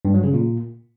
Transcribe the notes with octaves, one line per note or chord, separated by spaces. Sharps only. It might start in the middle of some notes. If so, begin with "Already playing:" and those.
G2
F#3
C#3
A#2